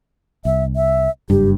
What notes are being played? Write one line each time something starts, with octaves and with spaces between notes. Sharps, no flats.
C2 E5
E5
F#1 G2 G4